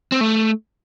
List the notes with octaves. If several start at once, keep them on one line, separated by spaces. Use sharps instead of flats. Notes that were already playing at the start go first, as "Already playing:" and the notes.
C4
A3